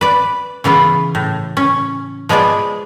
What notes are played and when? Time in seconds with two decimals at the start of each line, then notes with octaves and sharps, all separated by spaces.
0.01 B4 D5
0.64 C#3 E3 B3 F4
1.15 A2
1.57 C#4
2.29 F3 G#3 B3 G#4 D5